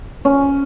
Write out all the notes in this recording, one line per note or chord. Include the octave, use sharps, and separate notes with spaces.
C#4